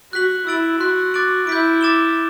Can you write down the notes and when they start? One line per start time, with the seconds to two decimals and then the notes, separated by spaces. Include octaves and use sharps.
0.13 F#4 F#6 B6 F#7
0.47 E4 E6 A6 D7 F#7
0.80 F#4 C6 F#6 B6
1.14 D6 F#6 A6 D7 F#7
1.47 E4 G6 B6 D7
1.81 D6 A6 E7 G7